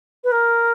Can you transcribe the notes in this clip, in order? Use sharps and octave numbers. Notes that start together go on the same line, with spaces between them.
B4
A#4